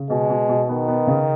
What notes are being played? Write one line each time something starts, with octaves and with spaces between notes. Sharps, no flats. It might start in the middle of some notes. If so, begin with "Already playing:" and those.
Already playing: C#3
B2 G#3
B2
B2
D#3 B3
B3
C#3